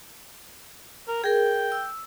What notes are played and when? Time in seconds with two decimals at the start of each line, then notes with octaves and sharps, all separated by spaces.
1.08 A#4
1.24 G#4 A#4 G5
1.72 E6